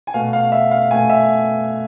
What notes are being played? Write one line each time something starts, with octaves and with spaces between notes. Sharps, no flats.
G#5
B2 A3 F5
F5
E5
F5
B2 A3 G#5
E5